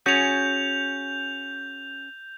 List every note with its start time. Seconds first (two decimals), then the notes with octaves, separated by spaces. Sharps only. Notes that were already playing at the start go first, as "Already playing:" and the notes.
0.06 C#4 F#4 G#4 G6 F7